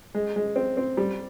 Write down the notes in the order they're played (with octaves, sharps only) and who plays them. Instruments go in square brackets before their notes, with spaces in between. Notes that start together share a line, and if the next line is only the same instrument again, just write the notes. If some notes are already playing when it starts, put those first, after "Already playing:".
[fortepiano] G#3
G#3
C4
C4
G3